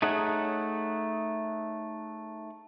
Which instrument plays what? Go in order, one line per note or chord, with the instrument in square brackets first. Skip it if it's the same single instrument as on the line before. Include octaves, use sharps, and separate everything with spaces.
[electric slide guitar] A3 D#4 G#4 C#5 F#5